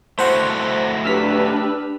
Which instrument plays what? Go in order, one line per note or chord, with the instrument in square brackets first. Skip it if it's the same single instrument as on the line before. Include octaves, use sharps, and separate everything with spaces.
[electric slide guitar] A3 E4 F#4 [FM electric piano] C5 F#5
[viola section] D4 G4 B4 [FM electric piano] E6 F6 B6